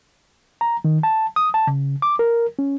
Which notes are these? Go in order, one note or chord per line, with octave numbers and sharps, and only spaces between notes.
A#5
D#3
A5
D#6
A5
C#3
D6
A#4
C#4